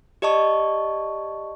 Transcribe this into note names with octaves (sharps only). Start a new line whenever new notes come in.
G4 D5 D#5 A5 C#6